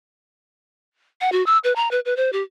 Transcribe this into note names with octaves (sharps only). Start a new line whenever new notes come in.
F#5
F#4
E6
B4
A#5
B4
B4
C5
G4